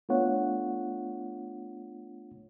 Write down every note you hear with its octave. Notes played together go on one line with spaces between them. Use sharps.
A3 B3 D4 F4 C#5 F#5